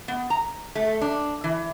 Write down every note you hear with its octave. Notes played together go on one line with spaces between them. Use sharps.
B3
A#5
A3
D4
E3